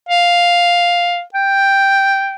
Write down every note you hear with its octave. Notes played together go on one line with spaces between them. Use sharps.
F5
G5